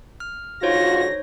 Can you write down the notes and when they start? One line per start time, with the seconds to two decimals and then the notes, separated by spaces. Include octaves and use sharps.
0.20 F6
0.63 G#2 D3 D#4 F4 F#4 C5 C#5 A#6